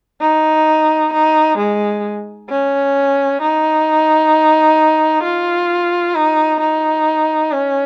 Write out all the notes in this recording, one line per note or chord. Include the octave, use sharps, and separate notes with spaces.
D#4
D#4
G#3
C#4
D#4
F4
D#4
D#4
C#4